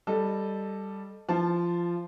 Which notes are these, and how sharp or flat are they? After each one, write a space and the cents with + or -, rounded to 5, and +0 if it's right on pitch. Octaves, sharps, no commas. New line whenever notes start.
G3 +0 A4 +0 D#5 -15
F3 -15 A5 +0